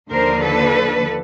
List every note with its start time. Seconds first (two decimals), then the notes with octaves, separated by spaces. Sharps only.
0.10 D#2 D3 F3 A#4 C5
0.41 A4 B4